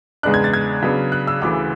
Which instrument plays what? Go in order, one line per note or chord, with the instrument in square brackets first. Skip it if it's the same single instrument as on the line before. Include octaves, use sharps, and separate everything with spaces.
[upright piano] E2 C#3 G#3 B3 D4 F#6
G#6
A6
G#6
C#3 F#3 B3 D4
F#6
E6
D2 C#3 E3 D6